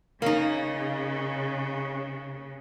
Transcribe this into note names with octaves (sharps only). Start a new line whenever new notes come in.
C#3 A#3 D#4